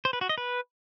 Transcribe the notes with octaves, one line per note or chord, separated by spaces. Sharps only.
C5
B4
F#4
D#5
B4